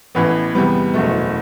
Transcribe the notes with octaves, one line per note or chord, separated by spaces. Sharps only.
A1 A2 E3 B3
E2 C3 G3 B3
F#1 E2 B2 A3